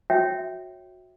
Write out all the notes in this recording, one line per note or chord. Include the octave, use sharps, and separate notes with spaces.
F#4 C#5 E5 G5